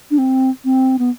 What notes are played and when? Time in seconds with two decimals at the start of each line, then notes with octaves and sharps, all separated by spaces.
0.11 D4
0.18 C4
0.65 C4
0.99 B3